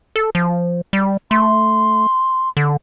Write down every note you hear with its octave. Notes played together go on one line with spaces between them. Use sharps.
A4
F3
G3
A3 C6
D3